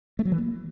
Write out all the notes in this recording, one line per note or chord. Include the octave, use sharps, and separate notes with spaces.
A3
F#3
E3
A#3